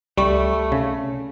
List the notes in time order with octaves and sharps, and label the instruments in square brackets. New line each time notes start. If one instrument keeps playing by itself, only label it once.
[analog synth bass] C#2 [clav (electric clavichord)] G3 [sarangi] A3 [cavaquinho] B5 C#6
[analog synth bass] C2 [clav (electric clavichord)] C#3